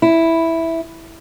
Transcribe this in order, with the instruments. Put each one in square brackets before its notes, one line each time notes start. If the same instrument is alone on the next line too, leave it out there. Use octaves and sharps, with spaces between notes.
[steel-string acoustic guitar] E4